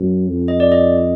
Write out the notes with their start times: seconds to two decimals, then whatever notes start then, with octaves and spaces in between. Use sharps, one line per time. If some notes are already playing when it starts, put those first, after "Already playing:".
Already playing: F#2
0.29 F2
0.48 D#5
0.60 D5
0.72 D#5